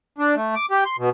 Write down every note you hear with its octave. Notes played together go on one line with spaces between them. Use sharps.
D4
A3
D6
G4
C6
B2